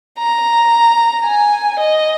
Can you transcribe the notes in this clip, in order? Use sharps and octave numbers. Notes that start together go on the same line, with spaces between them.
A#5
G#5
D#5